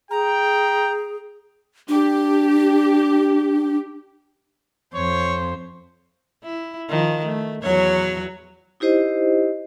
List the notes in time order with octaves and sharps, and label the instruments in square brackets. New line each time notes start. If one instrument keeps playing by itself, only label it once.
[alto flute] G#4 [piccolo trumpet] G5 [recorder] A#5
[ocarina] D4 [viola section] G4
[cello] F2 [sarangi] C5 [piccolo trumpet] C#5
[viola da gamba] E4
D#3 F3
A3
E2 F#3 C#5
[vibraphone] D#4 E4 G4 C5 D#5